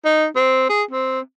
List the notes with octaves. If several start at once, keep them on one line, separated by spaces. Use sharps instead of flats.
D#4
C4
G#4
C4